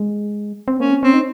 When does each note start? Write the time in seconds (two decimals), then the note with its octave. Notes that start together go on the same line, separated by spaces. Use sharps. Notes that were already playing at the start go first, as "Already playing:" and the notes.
Already playing: G#3
0.68 C4
0.79 A#3 C#4
0.91 C4
1.03 C4 C#4
1.14 D#4